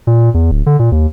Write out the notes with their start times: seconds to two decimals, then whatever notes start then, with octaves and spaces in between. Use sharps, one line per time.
0.07 A#2
0.34 E2
0.51 D1
0.66 D3
0.79 A#2
0.92 D#2